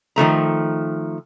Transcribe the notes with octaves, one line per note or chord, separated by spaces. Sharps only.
D#3 F3 A3 A#5